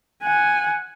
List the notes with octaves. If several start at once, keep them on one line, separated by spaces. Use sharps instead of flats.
F#5 G#5